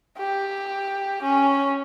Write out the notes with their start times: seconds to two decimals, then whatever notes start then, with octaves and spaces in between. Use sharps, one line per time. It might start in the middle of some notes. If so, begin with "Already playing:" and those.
0.18 G4
1.22 C#4